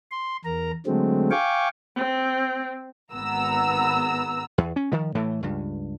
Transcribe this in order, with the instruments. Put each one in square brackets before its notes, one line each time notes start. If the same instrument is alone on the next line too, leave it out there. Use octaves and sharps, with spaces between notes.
[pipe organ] C6
E2 A#4 A#5
D3 F#3 G#3 A3 C4
F5 G5 G#5 C#6 D6
[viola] C4
[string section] G#1 B3 A#5 E6
[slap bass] E2
C#4
D#3 F3
A2 E3 A3
C#2 G2